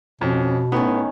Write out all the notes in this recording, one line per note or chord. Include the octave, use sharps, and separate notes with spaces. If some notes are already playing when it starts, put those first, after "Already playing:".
F2 B2 C#4
A2 D#3 B3 C#4